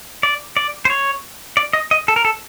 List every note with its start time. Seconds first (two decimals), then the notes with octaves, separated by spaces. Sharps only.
0.23 D5
0.57 D5
0.85 C5
0.90 C#5
1.57 D5
1.73 D#5
1.91 D#5
2.08 A4
2.16 A#4
2.25 A4